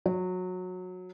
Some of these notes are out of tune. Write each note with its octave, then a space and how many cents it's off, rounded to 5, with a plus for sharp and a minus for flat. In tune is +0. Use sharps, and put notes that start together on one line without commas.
F#3 -20